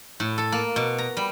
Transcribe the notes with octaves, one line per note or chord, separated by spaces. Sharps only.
A2
A4
A#3
B2
A#5
G3